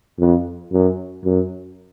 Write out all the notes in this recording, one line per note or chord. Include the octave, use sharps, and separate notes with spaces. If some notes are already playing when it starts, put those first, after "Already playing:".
F2
F#2
F#2